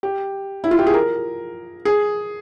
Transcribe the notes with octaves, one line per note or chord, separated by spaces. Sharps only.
G4
E4
F4
G4
G#4
A#4
G#4